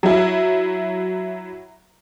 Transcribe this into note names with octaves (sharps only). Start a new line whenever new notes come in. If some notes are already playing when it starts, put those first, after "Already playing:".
F#3 E4